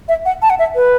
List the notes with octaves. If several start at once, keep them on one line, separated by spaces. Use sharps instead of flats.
E5
F#5
A5
F#5
E5
B4